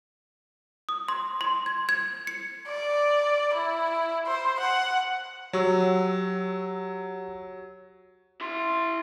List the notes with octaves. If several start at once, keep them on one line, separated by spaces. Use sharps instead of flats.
D#6
C6
C6
G#6
G#6
C#7
D5
E4
C5
F#5
F#3 G4 C#6 E6
E4 C6